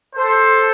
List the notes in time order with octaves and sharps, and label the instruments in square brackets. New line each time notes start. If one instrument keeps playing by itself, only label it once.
[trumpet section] A4 C5